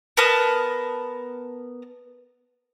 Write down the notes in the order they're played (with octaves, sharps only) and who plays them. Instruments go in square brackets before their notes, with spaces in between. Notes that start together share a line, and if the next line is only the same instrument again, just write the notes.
[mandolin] B3 A#4 A5 D#6